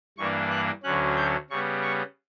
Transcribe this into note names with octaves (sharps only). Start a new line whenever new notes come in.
G2 E3 A#3 D4 C#6
F#6
D2 D3 F#3 C#4 F#6
G6
C#3 G3 B3 C#6
C#6